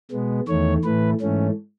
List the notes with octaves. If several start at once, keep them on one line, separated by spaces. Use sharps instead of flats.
B2 G#3 B3
E2 D#3 A3 C#5
A2 E3 A3 B4
G#2 E3 A3 C#4